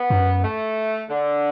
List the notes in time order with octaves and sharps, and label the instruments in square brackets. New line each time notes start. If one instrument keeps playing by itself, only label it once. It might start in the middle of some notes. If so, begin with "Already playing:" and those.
Already playing: [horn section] B3
[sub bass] F#2
[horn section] A3
D3